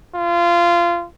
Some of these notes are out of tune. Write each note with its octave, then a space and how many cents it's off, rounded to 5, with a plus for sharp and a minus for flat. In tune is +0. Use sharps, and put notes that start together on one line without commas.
F4 -20